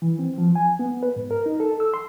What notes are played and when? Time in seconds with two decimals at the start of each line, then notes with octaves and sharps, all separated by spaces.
0.02 E3
0.19 C4
0.38 F3
0.55 G#5
0.79 B3
1.03 B4
1.16 G#2
1.31 A#4
1.46 D#4
1.60 A4
1.80 E6
1.94 C6